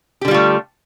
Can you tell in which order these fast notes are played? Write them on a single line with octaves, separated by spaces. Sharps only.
G4 D3 G3 F4 A3